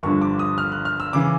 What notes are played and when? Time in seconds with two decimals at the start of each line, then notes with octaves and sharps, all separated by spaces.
0.03 G1 G2 D3 F3 C#6
0.22 D6
0.39 D#6
0.58 F6
0.72 F#6
0.85 F6
1.00 E6
1.13 C#3 E3 D6